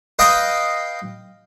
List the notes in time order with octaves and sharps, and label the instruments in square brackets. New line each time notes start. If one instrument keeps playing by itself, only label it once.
[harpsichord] B4 D#5 F5 G5 B5